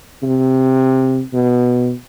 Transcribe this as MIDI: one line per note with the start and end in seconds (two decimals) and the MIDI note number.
0.23 1.21 48
1.33 1.92 47